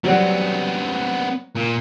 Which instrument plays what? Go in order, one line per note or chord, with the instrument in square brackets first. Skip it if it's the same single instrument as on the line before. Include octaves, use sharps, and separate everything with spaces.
[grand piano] F#3 G3 F#4 [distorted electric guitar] B3 C4
[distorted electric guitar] A#2